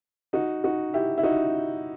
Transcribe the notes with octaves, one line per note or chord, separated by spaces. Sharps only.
D#4 F#4
D#4 F#4
E4 G4
E4
D#4 F#4